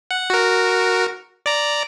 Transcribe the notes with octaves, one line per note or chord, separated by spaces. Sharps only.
F#5
F#4 A#4
D5 A#5